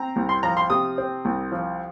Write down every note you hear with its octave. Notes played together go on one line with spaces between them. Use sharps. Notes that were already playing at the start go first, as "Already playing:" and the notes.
Already playing: C4 A#5
C2
C6
F3 A#5
C6
C3 D#6
C4
C2
F3